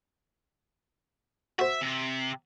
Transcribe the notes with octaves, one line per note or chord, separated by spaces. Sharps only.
F#4 C5 E5
C3